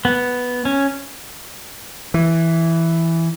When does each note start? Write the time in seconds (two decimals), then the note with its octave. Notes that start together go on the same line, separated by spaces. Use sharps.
0.05 B3
0.65 C#4
2.14 E3